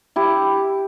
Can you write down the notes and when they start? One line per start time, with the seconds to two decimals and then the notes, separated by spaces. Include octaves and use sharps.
0.16 E4 G4